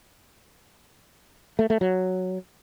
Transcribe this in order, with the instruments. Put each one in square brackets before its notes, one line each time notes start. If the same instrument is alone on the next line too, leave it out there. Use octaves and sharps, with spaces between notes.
[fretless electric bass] A3
A3
F#3